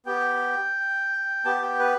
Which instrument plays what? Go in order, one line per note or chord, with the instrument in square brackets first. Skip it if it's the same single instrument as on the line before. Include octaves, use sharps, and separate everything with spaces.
[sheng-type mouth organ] B3 G4 G5
B3 G4 A5
G5
B4